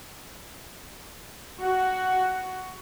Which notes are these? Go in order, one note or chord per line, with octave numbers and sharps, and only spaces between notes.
F#4